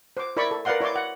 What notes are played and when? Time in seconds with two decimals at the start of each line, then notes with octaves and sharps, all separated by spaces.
0.17 C5 D6
0.37 E4 A#4 D5 E5 B5 C#6
0.51 A4
0.65 A#4 B4 D5 F5 F#5 C6
0.81 E4 C#5 D5 C6 D6
0.96 F#5